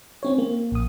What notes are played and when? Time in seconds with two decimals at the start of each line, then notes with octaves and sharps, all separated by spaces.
0.23 C4 C#4 C#5
0.38 A#3
0.72 A#1 D#6